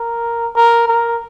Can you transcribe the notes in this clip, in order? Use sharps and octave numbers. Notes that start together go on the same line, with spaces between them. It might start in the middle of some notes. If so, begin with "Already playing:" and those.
Already playing: A#4
A#4
A#4